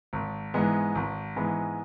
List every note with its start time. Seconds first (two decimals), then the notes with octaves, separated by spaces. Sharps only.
0.13 G#1
0.54 G#2 E3 G#3 B3
0.95 G#1
1.36 G#2 E3 G#3 B3